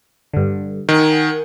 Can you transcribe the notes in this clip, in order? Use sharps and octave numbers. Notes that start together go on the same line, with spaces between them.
G2 D3
D#3 A#4 F#5 G#5